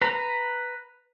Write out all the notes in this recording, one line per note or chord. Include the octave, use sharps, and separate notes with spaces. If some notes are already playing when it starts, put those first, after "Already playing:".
B4 A#5